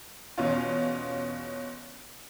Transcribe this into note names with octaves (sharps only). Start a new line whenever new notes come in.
E2 B2 C#4 F4